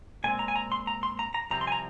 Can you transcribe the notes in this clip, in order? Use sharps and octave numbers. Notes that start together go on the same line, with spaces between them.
A#2 G#3 C4 G#5
A#5
G#5
A#5
C6
A#5
C6
A#5
A#5
C2 C3 F3 C4 A#5
C6
G#5
A#5